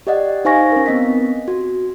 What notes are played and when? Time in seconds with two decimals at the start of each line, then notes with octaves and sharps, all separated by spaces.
0.07 G4 D5 D#5 F#5
0.45 D#4 C5 F5 G#5 C#6 A#6
0.72 C#4 A#4
0.86 B3 C4 D#5 B6
1.48 F#4